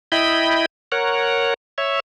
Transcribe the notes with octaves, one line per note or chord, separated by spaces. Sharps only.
E4 D#5 G5 B5
A#4 C#5 F#5
C#5 E5